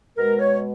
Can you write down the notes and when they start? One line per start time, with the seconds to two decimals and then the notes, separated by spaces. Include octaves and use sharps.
0.16 B2 G#3 A#4
0.38 C#5